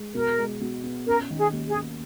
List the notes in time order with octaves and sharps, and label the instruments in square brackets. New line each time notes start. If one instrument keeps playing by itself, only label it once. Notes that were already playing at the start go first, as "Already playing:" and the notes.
Already playing: [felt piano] G#3
[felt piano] B2 [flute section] A#4
[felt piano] G#3
B2
B3
[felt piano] C#4 [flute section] A#4
[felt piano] D#3
[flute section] G#4
[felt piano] D#2
[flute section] G#4
[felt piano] A#3